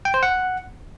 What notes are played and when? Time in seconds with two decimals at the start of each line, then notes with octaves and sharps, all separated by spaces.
0.05 G5
0.14 C5
0.23 F#5